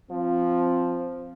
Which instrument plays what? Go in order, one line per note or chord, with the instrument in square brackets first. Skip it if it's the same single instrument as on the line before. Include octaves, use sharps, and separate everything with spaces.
[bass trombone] F3 [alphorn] C4